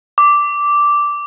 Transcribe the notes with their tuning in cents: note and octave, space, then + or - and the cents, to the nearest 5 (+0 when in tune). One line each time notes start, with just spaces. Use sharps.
D6 -5